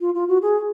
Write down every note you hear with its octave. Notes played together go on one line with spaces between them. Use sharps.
F4
F4
F#4
G#4